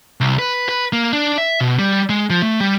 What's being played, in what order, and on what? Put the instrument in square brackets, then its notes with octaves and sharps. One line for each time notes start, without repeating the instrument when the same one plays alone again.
[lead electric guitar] C2
B4
B4
A#3
D4
E5
B2
G3
G#3
F3
A3
G3